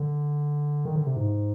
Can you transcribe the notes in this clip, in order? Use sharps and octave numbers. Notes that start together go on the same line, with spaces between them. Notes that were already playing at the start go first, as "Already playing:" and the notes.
Already playing: D3
D#3
D3
C3
G#2